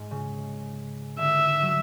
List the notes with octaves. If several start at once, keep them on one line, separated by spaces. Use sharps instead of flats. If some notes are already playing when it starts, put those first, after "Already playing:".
Already playing: G#2
C#3
D3 E5
F#3